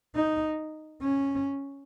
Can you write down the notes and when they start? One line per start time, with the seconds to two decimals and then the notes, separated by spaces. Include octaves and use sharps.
0.15 D#4
1.01 C#4